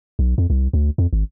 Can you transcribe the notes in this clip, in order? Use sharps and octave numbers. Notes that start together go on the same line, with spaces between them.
B1
F2
C2
D2
F2
G#1